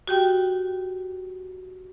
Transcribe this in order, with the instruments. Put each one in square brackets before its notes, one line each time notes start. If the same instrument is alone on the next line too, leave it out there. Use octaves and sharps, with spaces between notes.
[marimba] F#4 G4 G5